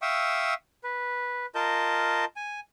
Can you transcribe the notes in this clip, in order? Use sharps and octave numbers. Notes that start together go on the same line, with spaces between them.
E5 F5 G5 C#6 D#6 E6
B4
F4 A#4 D#5 A5 G6
G#5